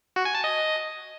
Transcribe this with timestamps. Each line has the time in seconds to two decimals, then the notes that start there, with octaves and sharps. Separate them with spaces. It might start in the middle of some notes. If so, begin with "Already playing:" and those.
0.16 F#4
0.25 G#5
0.35 A5
0.44 D#5